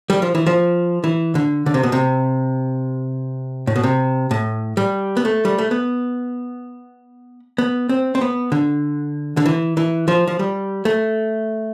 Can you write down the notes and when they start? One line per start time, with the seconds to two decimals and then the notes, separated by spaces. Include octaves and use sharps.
0.10 G3
0.22 F3
0.35 E3
0.47 F3
1.04 E3
1.35 D3
1.66 D3
1.74 C3
1.83 B2
1.92 C3
3.67 A2
3.76 B2
3.84 C3
4.31 A2
4.77 G3
5.17 B3
5.25 A3
5.45 G3
5.58 A3
5.71 B3
7.58 B3
7.89 C4
8.15 C4
8.21 B3
8.52 D3
9.37 D3
9.46 E3
9.77 E3
10.08 F3
10.28 F3
10.39 G3
10.85 A3